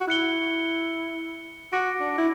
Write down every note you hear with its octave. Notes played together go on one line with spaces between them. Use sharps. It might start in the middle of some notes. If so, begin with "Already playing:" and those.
F#4
E4 F#6 C#7 G7
F#4 D6 A#6 D7
D4
E4